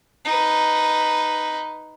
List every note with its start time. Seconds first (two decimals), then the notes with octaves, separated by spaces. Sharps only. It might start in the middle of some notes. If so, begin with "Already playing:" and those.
0.25 D#4 B4